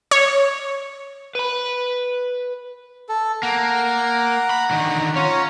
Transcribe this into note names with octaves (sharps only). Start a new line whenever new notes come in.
C#5
B4 B5
A4
A#3 F#5 A#5
B5
D3 D#3
C#4 F4 C#5 A#5